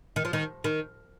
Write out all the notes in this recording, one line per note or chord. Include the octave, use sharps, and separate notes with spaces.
D#3
F3
D#3
D#3